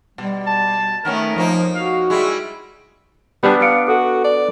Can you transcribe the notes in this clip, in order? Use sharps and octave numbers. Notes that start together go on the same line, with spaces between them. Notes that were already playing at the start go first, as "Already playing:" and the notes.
B2 G3
A5
D#3 A3 B3 C#4 A#4
F2 F3 A#3 D#4
F#4 F5
G3 G#3 E4
G3 B3 D4
F5 C#7 D7
F#4 A4
D5